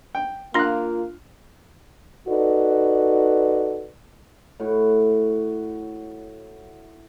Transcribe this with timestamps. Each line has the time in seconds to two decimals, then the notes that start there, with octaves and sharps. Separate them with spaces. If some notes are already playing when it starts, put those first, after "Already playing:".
0.15 G5
0.54 A#3 D4 F4 F5 C6 F#6
2.28 D#4 F#4 A4 B4 D5
4.60 A2 F#4